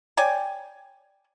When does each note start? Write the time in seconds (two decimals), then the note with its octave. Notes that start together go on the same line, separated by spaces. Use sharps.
0.17 C#5 D5 G5 G#5